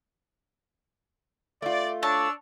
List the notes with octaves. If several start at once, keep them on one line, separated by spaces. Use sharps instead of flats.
A3 F4 D5
D4 C#5 A5 E6